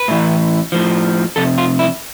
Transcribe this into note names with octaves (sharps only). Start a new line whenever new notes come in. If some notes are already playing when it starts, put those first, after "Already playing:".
Already playing: B4
A2 E3
A2 F3
F2 C3 A4
F4
E4